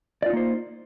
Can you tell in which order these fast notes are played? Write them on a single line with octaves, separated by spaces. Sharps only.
D5 F4 D#4 A#3 C5